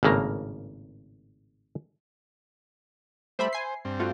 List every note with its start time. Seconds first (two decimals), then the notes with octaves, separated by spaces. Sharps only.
0.03 G#1 A2 C#3 A#3 A#5
3.39 G3 A3 C5 E5 B5
3.53 C5 G#5 C7
3.85 G2 C4
3.99 A3 F4 F#4